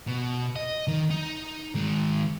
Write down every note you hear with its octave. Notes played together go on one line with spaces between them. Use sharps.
B2
D#5
D#3
D#4
D#3 G#3